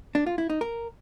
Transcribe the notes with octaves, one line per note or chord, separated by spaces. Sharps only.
D4
F4
E4
D#4
A#4